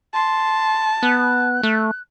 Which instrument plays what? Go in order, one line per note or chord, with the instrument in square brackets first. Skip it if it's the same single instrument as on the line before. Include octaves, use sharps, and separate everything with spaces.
[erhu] A5 [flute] C6
[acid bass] B3 [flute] F#6
[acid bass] A3